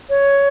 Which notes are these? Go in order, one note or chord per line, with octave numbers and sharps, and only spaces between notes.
C#5